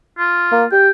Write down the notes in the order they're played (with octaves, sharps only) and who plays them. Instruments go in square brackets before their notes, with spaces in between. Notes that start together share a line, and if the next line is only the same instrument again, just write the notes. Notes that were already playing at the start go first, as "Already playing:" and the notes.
[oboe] F4
[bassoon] A#3
[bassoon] G4 [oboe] G5